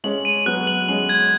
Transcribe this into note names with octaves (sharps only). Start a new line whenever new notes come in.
G#3 C#4 F#7
D#7
F#3 B3 F#6
F#7
G#3 C#4 F#7
G#6